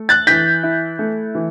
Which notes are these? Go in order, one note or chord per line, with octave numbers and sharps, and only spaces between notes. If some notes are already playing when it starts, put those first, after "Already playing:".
Already playing: A3
F#6 A6
E3 G6 B6
E4
A3
E3